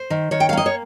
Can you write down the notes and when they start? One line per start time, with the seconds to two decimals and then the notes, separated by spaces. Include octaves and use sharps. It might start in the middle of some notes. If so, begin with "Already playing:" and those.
Already playing: C5
0.10 D#3
0.31 D#3 C#5
0.40 G5
0.49 F5
0.53 A#3 D#5
0.66 C#5